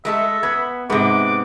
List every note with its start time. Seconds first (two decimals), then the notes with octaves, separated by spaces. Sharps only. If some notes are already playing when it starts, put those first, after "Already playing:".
0.05 G#3 A3 A4 E5
0.43 B3 G#6
0.90 G#2 C3 B3 D6